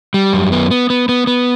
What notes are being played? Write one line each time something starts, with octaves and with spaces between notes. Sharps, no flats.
G3
F#2
B3
B3
B3
B3
B3